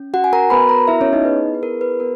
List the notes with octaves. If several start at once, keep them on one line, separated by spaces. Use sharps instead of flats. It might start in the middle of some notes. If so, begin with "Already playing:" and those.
Already playing: C#4
F#4 F#5
G#5
A#4 A#5
B3 F#4 B4 B5
A#4 A#5
E4 E5
C#4 C#5
D#4 D#5
B3 E4 G#4 B4
B4
A#4
B4
B3 F#4 A#4